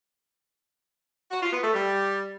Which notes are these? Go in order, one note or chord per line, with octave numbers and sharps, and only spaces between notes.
F#4
F4
B3
A3
G3